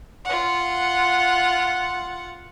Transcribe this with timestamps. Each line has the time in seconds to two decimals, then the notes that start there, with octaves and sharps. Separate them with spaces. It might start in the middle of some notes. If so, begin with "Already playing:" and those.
0.25 F4 F#5